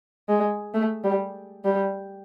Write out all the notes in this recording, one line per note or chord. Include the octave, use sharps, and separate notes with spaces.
G#3
A3
G3
G3